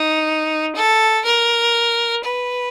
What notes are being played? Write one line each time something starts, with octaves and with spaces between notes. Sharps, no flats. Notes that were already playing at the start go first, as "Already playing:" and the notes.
Already playing: D#4
A4
A#4
B4